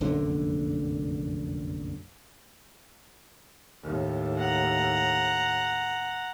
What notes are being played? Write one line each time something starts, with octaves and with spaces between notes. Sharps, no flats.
F1 A#1 F#2 D3
D#2 A2
F#5 A#5